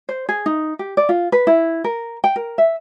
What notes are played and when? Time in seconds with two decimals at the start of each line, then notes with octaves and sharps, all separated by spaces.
0.09 C5
0.29 G#4
0.46 D#4
0.79 G4
0.97 D5
1.09 F4
1.32 B4
1.47 E4
1.84 A#4
2.24 G5
2.36 A#4
2.58 E5